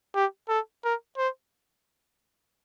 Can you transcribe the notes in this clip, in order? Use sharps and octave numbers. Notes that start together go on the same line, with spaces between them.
G4
A4
A#4
C5